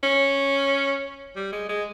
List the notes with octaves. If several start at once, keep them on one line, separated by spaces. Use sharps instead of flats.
C#4
G3
G#3
G#3